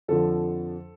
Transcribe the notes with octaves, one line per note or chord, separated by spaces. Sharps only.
F2 D3 F3 A4